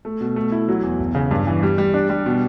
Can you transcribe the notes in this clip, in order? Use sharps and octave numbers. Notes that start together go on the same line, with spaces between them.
A3
B2
A3
E4
F#3
E2
E1
C#3
G2
E3
G3
G3
D4
G3
B2